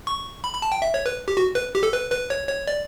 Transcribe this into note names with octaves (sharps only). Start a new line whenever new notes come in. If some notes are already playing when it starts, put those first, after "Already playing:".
C#6
B5
B5
A5
G5
E5
C#5
B4
G4
F#4
B4
G4
A4
B4
B4
C#5
C#5
D5